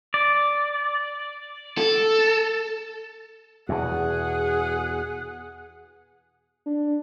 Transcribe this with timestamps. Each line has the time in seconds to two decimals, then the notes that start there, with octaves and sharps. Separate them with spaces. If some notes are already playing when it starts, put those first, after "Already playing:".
0.14 D5
1.78 A4
3.69 E2 B2 G#4 F#5
6.66 D4